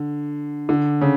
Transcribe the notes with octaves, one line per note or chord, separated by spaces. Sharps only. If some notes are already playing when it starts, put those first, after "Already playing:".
Already playing: D3
D3
C#3